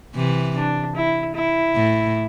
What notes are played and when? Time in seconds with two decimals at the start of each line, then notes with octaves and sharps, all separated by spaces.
0.15 C3 E3
0.55 D4
0.95 E4
1.35 E4
1.75 A2